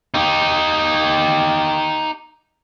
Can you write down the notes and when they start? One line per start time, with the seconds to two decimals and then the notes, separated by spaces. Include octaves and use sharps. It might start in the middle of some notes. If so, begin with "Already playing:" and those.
0.14 D#4 G4